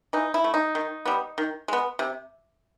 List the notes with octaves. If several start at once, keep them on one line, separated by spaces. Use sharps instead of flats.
E3 D#4
E4
A3
D#4
D#3
G3 B3
D#3
G#3 B3
C3